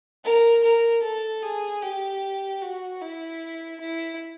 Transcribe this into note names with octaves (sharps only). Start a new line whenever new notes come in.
A#4
A#4
A4
G#4
G4
F#4
E4
E4